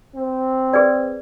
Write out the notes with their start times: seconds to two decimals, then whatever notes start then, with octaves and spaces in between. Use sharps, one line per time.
0.15 C4
0.73 G#4 B4 D5